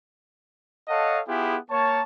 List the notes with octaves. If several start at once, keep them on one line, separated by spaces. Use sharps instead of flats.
A4 C#5 D#5 F5 F#5 A5
B3 E4 F4 G4 G#4
A#3 C#5 A5